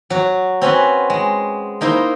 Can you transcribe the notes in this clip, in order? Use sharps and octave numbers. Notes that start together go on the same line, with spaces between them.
F#3 F#4
C4 C#4 F#4 B4
G#3
A#3 D#4 E4 C5